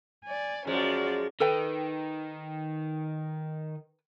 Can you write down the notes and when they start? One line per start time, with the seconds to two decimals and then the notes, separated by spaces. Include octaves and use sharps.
0.25 D5 G#5
0.67 F#2 F3 G#3 F#4 D5
1.40 D#3 A4 B4 G5